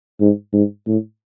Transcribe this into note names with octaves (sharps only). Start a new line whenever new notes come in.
G#2
G#2
A2